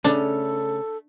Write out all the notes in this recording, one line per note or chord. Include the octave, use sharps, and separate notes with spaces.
C#3 A3 C#4 D4 A4